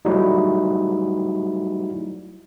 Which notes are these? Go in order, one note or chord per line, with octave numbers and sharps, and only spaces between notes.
F#3 G3 A3 D#4 E4 F#4